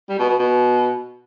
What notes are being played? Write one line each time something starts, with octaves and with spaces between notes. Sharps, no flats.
G3
B2
B2
B2